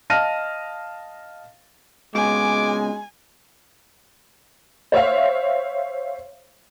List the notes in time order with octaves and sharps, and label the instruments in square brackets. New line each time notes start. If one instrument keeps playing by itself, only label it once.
[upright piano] D#5 F5 A5 F6 A#6 D#7
[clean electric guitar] C#2 B2 [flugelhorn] G#3 [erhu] G#5 [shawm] D6
[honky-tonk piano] C5 C#5 E5 F5